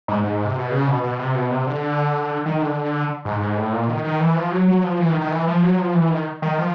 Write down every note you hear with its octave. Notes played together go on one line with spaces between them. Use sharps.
G#2
G#2
C3
B2
C#3
B2
B2
C3
B2
C3
D3
D#3
D3
G#2
G#2
A2
A#2
D#3
D#3
E3
F3
F#3
F#3
F3
E3
D#3
D#3
E3
F3
F#3
F3
E3
D#3
D#3
F3